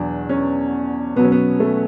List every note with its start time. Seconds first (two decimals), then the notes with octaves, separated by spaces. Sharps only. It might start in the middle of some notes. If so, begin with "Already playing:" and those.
Already playing: E2 B2 F#3 D4
0.29 C#4
1.16 B2 B3
1.19 F#3 C#4
1.32 B3
1.60 A3